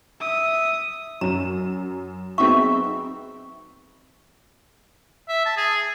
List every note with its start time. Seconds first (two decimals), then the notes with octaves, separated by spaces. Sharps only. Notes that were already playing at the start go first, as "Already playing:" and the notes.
0.21 E5 D#6
1.21 F#2 A#5 E7
2.38 F#3 B3 C4 D#4 G#4 E5 C#6
5.28 E5
5.46 A5
5.57 G#4